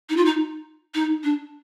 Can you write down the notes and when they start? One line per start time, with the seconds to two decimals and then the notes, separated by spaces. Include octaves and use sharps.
0.10 D#4
0.17 F4
0.25 D#4
0.95 D#4
1.24 D4